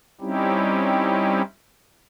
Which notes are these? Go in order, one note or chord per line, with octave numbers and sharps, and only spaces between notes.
G3 C4 C#4 D#4 E4 G4